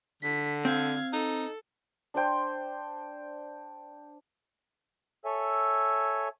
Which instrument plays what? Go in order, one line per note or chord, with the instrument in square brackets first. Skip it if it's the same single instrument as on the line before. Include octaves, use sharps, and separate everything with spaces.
[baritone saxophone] D3 [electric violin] B6
[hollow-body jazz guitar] C4 [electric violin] F5 G#6
[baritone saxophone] D#4 [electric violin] A4
[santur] D4 C5 G5
[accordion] A4 C#5 E5 G#5